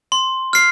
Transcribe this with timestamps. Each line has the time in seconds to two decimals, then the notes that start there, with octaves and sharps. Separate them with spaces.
0.12 C6
0.53 F6 C7